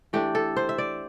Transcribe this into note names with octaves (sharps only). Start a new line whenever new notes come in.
E3 A3 D4 G4
A4
C5
E5
D5